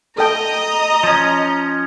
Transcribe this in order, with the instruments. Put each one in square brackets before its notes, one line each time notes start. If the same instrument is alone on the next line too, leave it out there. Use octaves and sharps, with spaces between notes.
[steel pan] A4 G5 [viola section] D#5 [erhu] A#5
[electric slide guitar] F3 C#4